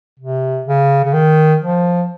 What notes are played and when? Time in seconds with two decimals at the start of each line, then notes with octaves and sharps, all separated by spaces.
0.19 C3
0.67 C#3
1.05 C#3
1.13 D#3
1.61 F3